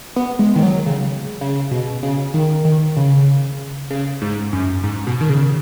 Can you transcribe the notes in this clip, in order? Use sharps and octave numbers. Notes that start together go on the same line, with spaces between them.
B3
G#3
D#3
F#3
C#3
C#3
B2
C#3
D#3
D#3
C#3
C#3
G#2
F#2
G#2
B2
D#3
C#3